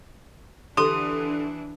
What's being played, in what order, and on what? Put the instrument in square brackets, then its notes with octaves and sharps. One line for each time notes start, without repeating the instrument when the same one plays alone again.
[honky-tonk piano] D3 [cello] E3 D4 [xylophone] G4 C6 [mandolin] D#6